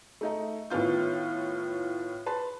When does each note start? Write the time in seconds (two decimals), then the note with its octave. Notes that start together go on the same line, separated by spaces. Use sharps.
0.21 A3 D#4 D#5
0.70 A2 D#3 B3 F4 G6
2.26 B4 A5 C6